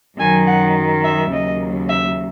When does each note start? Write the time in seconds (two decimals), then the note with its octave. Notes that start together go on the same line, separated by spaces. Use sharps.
0.18 F#2 D#3 F#3 G#5
0.47 F#5
1.04 E5
1.31 D#2 C#3 F#3 D#5
1.89 E5